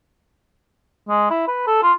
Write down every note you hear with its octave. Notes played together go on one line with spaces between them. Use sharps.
G#3
E4
B4
A4
F4